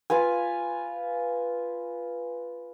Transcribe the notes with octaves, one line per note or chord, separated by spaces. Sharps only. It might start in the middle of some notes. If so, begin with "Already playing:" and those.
F4 B4 F5 G#5